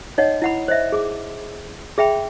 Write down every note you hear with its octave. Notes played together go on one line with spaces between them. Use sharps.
D#4 C#5 D#5 F#5
E4 F#5 B5
C5 D#5 E5
G#4 D6
G#4 E5 G5 B5